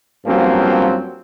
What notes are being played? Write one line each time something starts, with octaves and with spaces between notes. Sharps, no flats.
G2 F3 F#3 A#3 C4 C#4